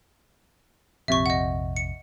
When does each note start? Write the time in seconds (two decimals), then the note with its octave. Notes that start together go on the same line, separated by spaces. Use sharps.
1.08 A#1 F2 C3 E5 C#6
1.26 D#5 F#5
1.76 C#7